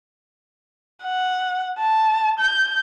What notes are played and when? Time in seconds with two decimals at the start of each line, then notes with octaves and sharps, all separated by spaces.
1.04 F#5
1.79 A5
2.39 G6